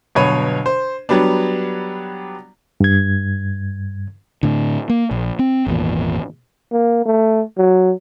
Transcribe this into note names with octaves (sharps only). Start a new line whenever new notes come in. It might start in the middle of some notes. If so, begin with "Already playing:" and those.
G1 B2 F#3 C#5 B5 D#7
C5
F#3 G3 B3 D4
G2 G#6
A2 D3
A#3
A#1
C4
G#1 E2 A#2
A#3
A3
F#3